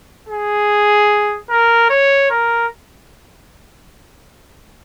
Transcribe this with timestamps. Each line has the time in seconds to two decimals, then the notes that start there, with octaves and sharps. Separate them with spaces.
0.29 G#4
1.50 A#4
1.90 C#5
2.30 A#4